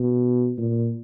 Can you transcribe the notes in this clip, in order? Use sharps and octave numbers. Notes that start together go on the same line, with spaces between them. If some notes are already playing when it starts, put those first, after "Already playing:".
Already playing: B2
A#2